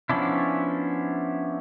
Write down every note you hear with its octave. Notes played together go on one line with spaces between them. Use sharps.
F3 B3 C#4 D4 E4